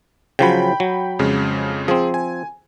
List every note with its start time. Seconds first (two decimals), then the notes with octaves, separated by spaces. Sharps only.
0.39 C#3 F3 F#3 G5 B5
0.80 F#3
1.19 F2 C#3 G#3
1.88 F3 C4 G#4
2.14 G#5